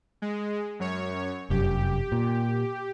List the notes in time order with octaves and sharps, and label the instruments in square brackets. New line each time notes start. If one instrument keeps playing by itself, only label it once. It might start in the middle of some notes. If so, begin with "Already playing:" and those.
[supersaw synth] G#3
F#2 C#5
[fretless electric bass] F1 F#2 [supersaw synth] G4
[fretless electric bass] A#2